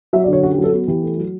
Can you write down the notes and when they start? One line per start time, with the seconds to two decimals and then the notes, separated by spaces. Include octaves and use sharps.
0.13 F#3 E5
0.24 D5
0.28 D3 C#5
0.43 C#4 F#4
0.53 G4
0.58 F#3
0.64 A4
0.72 B3 F#4
0.88 E3 G4
1.03 A3
1.17 F#3